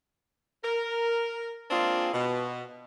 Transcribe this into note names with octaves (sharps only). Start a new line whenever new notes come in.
A#4
G#3 A#3 C4 D4 F4 G#4
B2